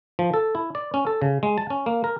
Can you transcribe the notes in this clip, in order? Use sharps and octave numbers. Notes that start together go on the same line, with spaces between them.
F3
A4
E4
D5
C#4
A4
C#3
G#3
A5
C#4
A#3
A#4